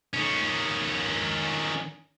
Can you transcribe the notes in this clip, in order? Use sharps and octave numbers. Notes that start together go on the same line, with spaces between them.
D#3 C#4